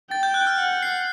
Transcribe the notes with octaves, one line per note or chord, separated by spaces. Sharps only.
G5 A6
G6
F#6
F6
F#5
C7